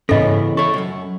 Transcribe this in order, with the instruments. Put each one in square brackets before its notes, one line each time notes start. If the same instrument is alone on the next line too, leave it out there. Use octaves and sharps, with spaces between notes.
[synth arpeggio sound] G#2 A#6 [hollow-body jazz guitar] C#3 E3 B3 [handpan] C#4 [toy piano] A4 D#5
[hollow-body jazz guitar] A4 C#5 [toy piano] C#6
[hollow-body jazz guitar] C#2 F#2